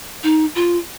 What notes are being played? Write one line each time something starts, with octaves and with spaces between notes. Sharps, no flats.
D#4
F4